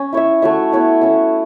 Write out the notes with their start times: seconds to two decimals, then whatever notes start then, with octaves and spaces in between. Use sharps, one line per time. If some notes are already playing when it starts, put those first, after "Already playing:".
Already playing: C#4
0.13 E4 C#5 E5
0.42 A3 F#4 C#5 E5
0.72 B3 E4 C#5 E5
1.01 C#4 A4 E5